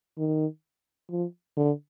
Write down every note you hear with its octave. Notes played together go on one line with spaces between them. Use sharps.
D#3
F3
D3